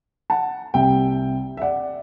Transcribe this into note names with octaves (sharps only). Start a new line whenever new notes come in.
F#5 A5
C2 C3 G3 E5 G5
E5
D5 F#5